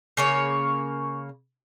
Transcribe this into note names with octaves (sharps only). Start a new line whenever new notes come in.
C#3 A#3 C#5